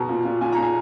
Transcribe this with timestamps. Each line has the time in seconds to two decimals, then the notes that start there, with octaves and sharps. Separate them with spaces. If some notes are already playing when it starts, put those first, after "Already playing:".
Already playing: B2 A#5
0.09 A#2
0.25 A#2
0.41 A#2 G#5
0.52 A#5
0.58 A#2 G#5